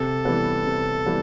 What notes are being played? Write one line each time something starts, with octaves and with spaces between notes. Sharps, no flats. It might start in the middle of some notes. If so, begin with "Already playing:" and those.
Already playing: C3 A4
E3 G3 B3
C3
E3 G3 B3